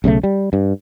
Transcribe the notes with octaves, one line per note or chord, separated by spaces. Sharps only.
B1 C#3 G3 A3
G3
G2